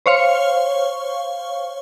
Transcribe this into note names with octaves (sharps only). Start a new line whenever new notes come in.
C5 C#5 F5 C#6